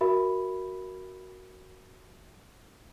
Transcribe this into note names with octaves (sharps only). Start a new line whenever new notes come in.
F#4 A#4 E5 B5